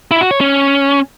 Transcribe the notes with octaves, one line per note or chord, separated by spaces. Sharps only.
E4
F#4
C#5
C#4